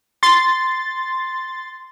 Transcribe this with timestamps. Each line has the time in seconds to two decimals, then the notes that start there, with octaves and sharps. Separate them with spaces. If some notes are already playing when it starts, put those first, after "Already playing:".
0.23 C6 A6